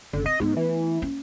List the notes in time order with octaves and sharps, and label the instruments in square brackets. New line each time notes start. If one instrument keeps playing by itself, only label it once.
[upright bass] F#1 [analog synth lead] D3
[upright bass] C4 [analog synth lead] D#5
[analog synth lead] G#2 [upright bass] A3 B3
[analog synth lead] E3
[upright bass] A#3 C#4